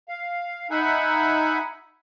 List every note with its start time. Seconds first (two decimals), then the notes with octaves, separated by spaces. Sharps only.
0.09 F5
0.71 D#4 E5 F#5 G#5 B5